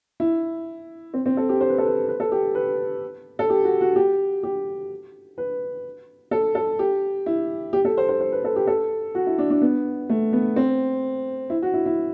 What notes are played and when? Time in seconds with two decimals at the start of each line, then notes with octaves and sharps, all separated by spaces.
0.20 E4
1.14 C4
1.26 C4
1.37 A4
1.49 G4
1.61 C5
1.69 B4
1.78 A4
1.86 B4
2.08 B4
2.20 A4
2.32 G4
2.55 B4
3.39 A4
3.50 G4
3.64 F#4
3.81 F#4
3.96 G4
4.43 G4
5.38 B4
6.31 A4
6.55 A4
6.79 G4
7.26 E4
7.73 G4
7.85 A4
7.97 C5
8.09 C5
8.20 C5
8.32 B4
8.44 A4
8.56 G4
8.67 A4
9.15 F#4
9.27 E4
9.38 D4
9.50 D4
9.61 B3
10.10 A3
10.33 B3
10.56 C4
11.50 E4
11.62 F#4
11.74 E4
11.86 E4